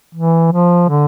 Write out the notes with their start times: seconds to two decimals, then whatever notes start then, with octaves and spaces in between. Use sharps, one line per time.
0.15 E3
0.52 F3
0.89 D3